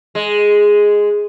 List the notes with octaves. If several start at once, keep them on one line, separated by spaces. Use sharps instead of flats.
G#3